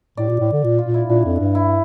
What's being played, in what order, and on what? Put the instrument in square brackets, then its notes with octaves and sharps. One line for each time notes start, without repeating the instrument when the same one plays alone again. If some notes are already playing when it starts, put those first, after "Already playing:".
[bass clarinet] A2 [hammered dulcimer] D5
[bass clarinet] A#2
A2
D3
A#2
[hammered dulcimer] F4
[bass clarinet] A#2
[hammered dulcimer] E4
[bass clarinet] A#2 [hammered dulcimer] D4
[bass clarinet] F2
G2
[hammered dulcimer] E4